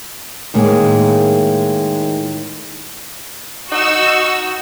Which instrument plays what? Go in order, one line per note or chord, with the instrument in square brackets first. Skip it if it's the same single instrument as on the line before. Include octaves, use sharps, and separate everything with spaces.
[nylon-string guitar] A2 D#3 G#3 A#3
[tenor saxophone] D#4 [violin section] F#4 E6